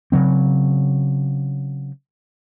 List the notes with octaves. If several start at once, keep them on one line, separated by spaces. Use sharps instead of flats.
C#3 F#3 C4